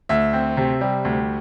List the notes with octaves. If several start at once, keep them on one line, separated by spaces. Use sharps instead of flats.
D2 E5
C4
C3
G3
D2